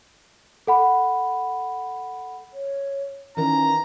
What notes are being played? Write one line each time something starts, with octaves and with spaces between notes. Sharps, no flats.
A4 F#5 B5
C#5
D#3 E3 C#4 A#5